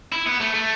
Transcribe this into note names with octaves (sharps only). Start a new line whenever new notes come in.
E4
B3
A3
A3